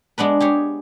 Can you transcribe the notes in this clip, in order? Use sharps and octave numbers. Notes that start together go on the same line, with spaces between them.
G#3 B3 D4 B4
G4 G#4 C#5